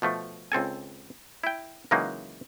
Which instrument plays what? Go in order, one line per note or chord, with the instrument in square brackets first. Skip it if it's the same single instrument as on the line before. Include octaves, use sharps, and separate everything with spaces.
[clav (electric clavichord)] B2 F3 A3
C#2 C4 A4 G#5
E4 G5
C#3 E3 F#3 G#3 A#3 D#4